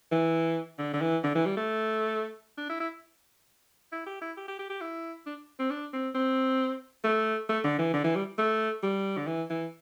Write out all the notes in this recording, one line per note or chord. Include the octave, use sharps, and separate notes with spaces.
E3
D3
D3
E3
D3
E3
G3
A3
D4
E4
E4
E4
G4
E4
G4
G4
G4
G4
E4
D4
C4
D4
C4
C4
A3
A3
D3
E3
D3
E3
G3
A3
G3
D3
E3
E3